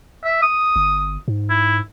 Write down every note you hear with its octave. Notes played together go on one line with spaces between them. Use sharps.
E5
D#6
G1
G#2
E4